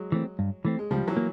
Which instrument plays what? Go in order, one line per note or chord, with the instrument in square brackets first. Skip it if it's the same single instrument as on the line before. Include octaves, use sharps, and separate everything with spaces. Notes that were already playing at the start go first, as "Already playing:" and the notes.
Already playing: [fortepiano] F#3 G#3
[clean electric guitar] E3 A3 C4
G2
E3 A3 C4
[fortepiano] G#3
[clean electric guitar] C#2 [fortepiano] F3 G3
[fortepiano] E3 F#3
[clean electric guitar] A#3